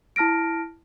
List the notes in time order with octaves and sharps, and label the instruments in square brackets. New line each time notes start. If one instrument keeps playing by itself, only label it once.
[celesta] E4 A5 F6 A#6 D7